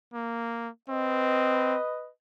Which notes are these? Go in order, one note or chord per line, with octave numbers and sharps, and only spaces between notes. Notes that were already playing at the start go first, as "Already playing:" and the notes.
A#3
C4 B4 D#5